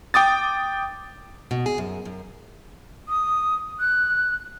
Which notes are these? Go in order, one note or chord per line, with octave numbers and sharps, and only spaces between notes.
G5 D6 D#6 A6
B2
G#4
F#2
F#2
D#6
F#6